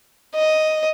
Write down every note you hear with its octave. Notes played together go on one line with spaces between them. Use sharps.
D#5